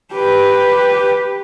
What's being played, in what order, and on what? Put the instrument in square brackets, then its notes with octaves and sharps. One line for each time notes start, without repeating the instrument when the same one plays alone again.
[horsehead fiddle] G4 B4